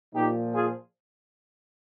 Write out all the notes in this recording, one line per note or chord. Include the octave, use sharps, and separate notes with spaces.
A#2 F3 D#4 G4
F4 G#4